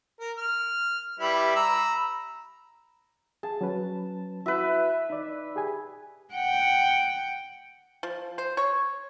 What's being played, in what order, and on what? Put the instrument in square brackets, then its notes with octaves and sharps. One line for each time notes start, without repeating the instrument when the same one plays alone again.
[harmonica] A#4
F6
G3 E4 B4
A#5 B5 E6
[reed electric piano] G#4 [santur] A5
[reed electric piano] F#3 C#4 B4
[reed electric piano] E4 F#4 [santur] B4 E5
[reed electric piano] D#4 D5
G4 G#4 G#5
[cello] F#5 G5
[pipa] F3
C5
C#5